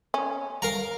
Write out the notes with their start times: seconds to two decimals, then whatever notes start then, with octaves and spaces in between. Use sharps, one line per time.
0.14 C#4
0.62 A#4 F5 A#5